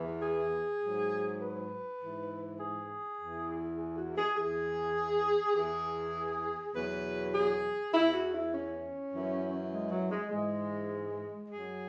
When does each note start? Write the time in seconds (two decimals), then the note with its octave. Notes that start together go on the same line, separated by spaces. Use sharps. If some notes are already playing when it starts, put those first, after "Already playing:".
Already playing: E2 E3
0.21 G#4
0.81 G#2 F#3
1.41 B4
2.00 G#2 E3
2.59 G#4
3.18 E2 E3
3.77 G#4
3.97 F#4
4.17 G#4
4.37 E2 E3 G#4
5.56 E2 E3 G#4
6.75 E2 B2 F#3 B4
7.35 G#4
7.94 E2 E3 E4
8.14 F#4
8.33 E4
8.53 C#4
9.13 F#2 E3
9.72 G#3
9.91 F#3
10.12 G#3
10.31 G#2 E3 G#3
11.50 F#2 F#3 G#4